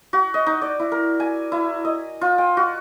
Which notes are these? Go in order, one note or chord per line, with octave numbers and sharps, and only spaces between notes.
F#4
D#5
D#4
D5
E4
A#4
G#5
E4
D#5
F4
G5
F#4